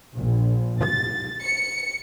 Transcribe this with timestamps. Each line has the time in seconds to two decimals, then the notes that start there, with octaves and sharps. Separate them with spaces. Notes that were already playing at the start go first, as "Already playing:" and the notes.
0.17 A#1
0.83 A6
1.43 C#7